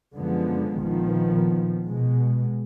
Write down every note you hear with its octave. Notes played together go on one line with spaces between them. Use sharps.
F#2 D3 F3 G#3 B3
A#1 D#3 F3 B3
B2 G#3